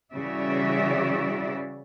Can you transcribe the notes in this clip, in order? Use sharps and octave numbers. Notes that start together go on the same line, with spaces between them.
C#3 E3 G3 F#4 D5 E5